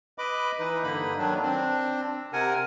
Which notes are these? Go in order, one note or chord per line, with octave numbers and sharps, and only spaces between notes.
B4 D#5 B5 D6
E3 D#4 B4
G2 D3 A#3 D#4 B5
D#3 F#3 D4
C4 D4
C3 A#4 F#5 G#5